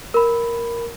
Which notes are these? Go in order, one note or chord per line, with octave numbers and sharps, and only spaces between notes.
A#4 B5